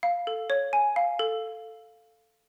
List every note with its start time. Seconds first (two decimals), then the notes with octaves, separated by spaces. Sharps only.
0.03 F5
0.27 A4
0.50 C#5
0.73 G#5
0.96 F5
1.19 A4